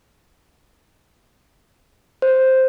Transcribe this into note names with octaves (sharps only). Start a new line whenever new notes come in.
C5